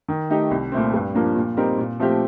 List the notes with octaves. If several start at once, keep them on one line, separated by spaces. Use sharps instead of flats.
D#3
A3 D#4 G4
C2
A#2 A3 C4
G2
F3 A#3 D4
A#2
G3 C4 D#4 A#4
A#2
F3 A3 C4 G4